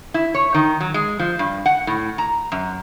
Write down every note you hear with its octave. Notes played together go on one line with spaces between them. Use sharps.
E4
C#5
D#3
F#3
G#3
F3
G2
F#5
A2
A#5
F#2